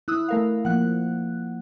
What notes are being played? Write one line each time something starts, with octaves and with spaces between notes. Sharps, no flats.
E4 D#6 E6 F#6
A3 A#4 F5
F3 A#3 F#5 F#6